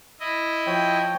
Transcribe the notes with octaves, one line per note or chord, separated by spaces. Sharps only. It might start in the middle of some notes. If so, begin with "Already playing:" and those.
E4 D#5
F3 C#5 G5